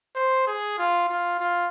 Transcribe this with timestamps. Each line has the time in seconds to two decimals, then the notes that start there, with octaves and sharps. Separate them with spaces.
0.15 C5
0.47 G#4
0.78 F4
1.09 F4
1.40 F4